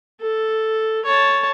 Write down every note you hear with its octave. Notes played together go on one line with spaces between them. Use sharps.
A4
C#5 A5